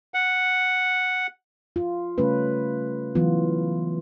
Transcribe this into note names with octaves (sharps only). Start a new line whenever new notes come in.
F#5
F4
C#3 G3 A3 C#4 B4
E3 F#3 B3 F4